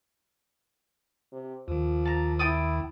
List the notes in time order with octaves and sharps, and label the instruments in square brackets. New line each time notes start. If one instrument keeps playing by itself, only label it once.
[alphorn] C3
[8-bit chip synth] D#2 D#3 [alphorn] F3
[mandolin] A5 A#5
[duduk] E4 [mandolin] G5 A5 D#6